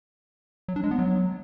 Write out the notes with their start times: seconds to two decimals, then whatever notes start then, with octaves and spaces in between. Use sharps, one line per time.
0.68 F#3
0.76 D4
0.84 G#3
0.91 B3
0.99 F#3